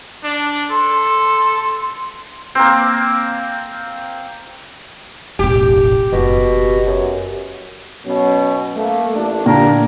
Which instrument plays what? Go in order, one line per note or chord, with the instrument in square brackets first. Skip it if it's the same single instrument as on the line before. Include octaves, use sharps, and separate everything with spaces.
[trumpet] D4
[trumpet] A4 [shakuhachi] C6
[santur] A#3 C4
[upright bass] E1 A1 [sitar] G4
[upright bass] F#1 [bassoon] B2
[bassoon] F#2
[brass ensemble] B2 F#3 C#4
A3 A#3
A1 A3 D4
[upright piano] A#2 D3 [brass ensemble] D4 G4 A#4